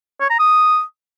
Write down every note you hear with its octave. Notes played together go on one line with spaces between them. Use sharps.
C#5
A#5
D#6